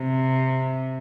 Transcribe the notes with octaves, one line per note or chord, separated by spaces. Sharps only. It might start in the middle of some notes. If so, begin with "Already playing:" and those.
Already playing: C3